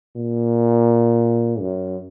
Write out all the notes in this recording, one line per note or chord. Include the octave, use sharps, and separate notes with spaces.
A#2
F#2